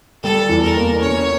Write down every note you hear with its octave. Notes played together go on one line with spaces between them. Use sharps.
G3 A4
E2
A#4
A#3
C#4 C#5